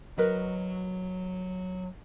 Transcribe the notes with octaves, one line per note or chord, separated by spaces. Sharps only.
F#3 A#4 B4 D#5